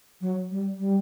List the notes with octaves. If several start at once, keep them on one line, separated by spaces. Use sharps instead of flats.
F#3
G3
G3